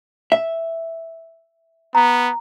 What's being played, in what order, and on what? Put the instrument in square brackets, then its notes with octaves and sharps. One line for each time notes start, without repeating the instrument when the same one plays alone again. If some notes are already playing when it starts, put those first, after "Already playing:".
[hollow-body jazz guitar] E5
[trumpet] B3 [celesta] A#5